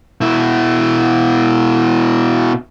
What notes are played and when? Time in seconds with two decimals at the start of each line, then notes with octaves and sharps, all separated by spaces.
0.21 B2 E4